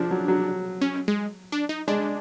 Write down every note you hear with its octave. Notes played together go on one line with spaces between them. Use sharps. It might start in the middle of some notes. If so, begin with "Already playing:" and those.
Already playing: F3 D4
F#3
F#3
C#4
G#3
D4
D#4
G#3 D4